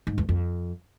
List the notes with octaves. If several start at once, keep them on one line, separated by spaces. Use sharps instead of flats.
G#2
E2
F2